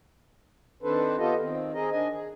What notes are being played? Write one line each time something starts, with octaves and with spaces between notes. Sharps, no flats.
D#3 C4 D4 A4 B4 C5
B3 F4 G4 A4 D#5
D#3 C4
C4 G#4 A#4 D#5
D#3 D4 D#5 G#5
G#4